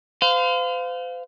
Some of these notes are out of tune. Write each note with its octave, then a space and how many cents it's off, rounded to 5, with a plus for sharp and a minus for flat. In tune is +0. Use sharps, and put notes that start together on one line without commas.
C5 -40 F5 +5